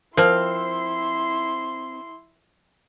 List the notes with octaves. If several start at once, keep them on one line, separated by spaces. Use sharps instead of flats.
F3 C4 E4 A#4 C6 F6